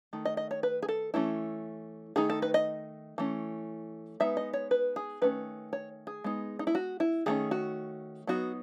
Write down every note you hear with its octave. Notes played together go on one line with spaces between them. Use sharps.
D#3 A3
D#5
D#5
C#5
B4
G#4
A4
E3 A3 C#4 E4
D#3 A3 D#4 G#4
A4
B4
D#5
E3 A3 C#4
G#3 B3 D#4 E5
D#5
C#5
B4
G#4
D#3 A3 C#4 B4
C#5
G#4
G#3 B3 D#4
D#4
E4
F#4
E4
D#3 A3 C#4 G#4
F#4
F#3 B3 D#4 F#4